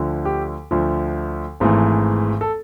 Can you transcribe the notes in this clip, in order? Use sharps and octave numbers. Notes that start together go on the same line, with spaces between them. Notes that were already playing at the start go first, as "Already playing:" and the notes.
Already playing: D2 D3 F3
G4
D2 D3 F3
G#1 G#2 E3 A3
A4